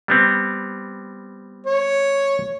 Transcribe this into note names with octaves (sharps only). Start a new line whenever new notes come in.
G3 B3 C4
C#5